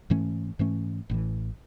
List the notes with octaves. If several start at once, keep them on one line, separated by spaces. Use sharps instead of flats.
G#2 E3 A3 C#4
G#2 E3 A3 C#4
A1 A2 E3